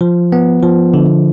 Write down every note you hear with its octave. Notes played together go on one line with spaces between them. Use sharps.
F3
B3
F3
D3